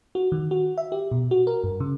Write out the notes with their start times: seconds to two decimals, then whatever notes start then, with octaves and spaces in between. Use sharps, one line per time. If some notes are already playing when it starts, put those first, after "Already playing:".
0.15 F#4
0.32 D#3
0.51 F#4
0.78 E5
0.92 G4
1.11 B2
1.31 F#4
1.47 A#4
1.64 G2
1.80 C#3